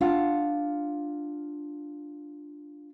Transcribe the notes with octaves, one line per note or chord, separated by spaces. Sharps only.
D4 F4 F5 F#5